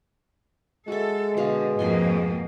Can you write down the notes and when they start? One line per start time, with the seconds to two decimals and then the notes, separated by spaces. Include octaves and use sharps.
0.88 G#3 F#4 A4 E5
1.37 B2 D3 F5
1.79 F2 G#2 A#3 G#4 D#5 G#5